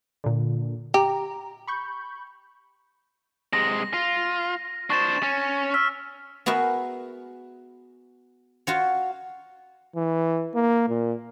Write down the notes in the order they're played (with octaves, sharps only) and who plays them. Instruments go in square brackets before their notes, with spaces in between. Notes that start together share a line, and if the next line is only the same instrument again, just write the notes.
[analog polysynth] A#2 D3
[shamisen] G4 [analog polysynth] A#5
[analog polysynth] B5 C#6 G6
[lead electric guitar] C3 G#3 [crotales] A#6
[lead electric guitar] F4
[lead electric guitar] D4 C5 [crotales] C#6 A6 E7
[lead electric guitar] C#4
[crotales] E6 F6 B6
[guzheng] B3 F#4 G#4 A#4 E5
F4 F#4 C#5
[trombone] E3
A#3
A#2